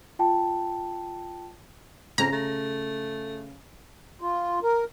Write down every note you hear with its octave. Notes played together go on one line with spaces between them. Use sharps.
F4 G5 A5
F2 C#3 A#5
A3
F4
A#4